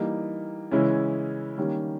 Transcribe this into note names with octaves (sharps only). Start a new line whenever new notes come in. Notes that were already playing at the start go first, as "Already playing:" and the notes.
Already playing: E3 G3 A#3 D#4
C#3 E3 G#3 C#4 E4
D#3 G3 A#3 C#4